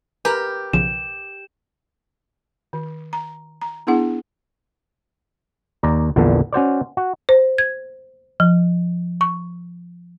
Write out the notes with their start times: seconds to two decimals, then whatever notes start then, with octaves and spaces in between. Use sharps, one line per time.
0.25 G4 A#4 B4 G#5 A#5 F#6
0.73 B1 C#3 F3 E7
2.73 D#3
3.13 A#5
3.62 A#5
3.87 B3 D4 E4 G#4 F#5
5.83 D#2 D5 A#5
6.16 A#1 E2 A#2 D3
6.53 C#4 F#4 C5 D5
6.97 F#4
7.29 C5
7.58 G#6
8.40 F3
9.21 C#6